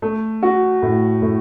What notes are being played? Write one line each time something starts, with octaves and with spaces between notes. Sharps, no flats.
A3
F#4
A2
A2